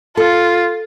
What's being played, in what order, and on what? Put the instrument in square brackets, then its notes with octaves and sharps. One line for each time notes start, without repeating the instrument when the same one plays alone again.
[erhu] F4 [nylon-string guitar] A4